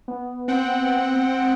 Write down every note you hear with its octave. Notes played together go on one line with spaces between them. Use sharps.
B3
C4 F#5 G5